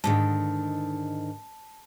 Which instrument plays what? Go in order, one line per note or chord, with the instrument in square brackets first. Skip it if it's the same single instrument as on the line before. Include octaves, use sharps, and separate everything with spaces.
[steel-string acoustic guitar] G#2 D3 D#3 [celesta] A5